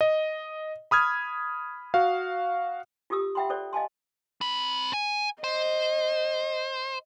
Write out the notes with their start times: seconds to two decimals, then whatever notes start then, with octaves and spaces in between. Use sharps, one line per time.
0.01 D#5
0.91 B5 D#6 F6 G#6
1.94 F#4 F5
3.10 F4 G4 A4 D#6 E6
3.35 E5 F#5 G5 B5 C6
3.50 A4 C5 D5
3.73 D#5 F5 G#5 A5 C6
4.41 C4 B5
4.93 G#5
5.44 C5 D#5